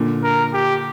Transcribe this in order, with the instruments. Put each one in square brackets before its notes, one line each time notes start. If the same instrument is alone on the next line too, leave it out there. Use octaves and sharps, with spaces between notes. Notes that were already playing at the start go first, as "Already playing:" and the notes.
Already playing: [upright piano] A#2 D3
[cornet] A#4
G4